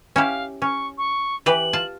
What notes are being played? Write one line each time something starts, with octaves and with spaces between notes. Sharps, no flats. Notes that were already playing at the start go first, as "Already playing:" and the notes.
C#4 E4 G4 F5
C#4 C#6
C#6
E3 G4 B4 F#7
F4 A5